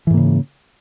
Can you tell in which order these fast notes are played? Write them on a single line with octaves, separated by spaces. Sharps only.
E3 G#2 A#3 C#3